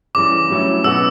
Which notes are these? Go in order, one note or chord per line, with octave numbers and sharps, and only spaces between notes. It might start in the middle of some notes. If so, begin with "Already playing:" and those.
C#3 E3 G3 D6
A2 F#3 C#4 E4
B2 F#3 C#4 F#4 B4 E6